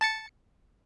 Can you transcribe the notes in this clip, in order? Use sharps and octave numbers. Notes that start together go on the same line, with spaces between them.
A5 A6 C#7